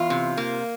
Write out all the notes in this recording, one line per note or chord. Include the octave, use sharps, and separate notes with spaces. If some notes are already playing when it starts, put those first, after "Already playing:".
Already playing: E2 F4
C3
A#3